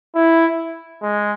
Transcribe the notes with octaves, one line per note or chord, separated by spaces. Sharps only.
E4
G#3